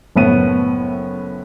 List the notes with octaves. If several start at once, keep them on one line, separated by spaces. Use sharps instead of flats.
F#1 A2 B3 D#7